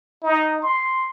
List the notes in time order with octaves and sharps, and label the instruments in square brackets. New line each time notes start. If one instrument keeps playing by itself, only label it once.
[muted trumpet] D#4
C6